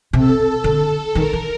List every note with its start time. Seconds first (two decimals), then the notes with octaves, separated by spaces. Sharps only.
0.13 C3 A4
0.64 D3
1.15 D#3 A#4
1.33 D#3